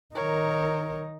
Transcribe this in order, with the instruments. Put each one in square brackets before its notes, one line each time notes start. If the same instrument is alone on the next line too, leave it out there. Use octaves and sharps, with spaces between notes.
[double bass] D#3 D#4 [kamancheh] A#4 C#5